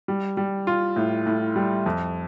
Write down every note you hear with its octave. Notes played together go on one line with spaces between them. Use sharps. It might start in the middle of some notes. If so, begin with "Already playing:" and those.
G3
G3
F4
A2
A2
G3
F2